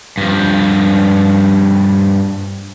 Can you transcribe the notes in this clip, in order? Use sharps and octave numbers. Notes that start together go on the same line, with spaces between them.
G2 F3